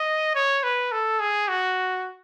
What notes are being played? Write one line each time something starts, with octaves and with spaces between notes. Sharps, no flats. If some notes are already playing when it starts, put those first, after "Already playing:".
Already playing: D#5
C#5
B4
A4
G#4
F#4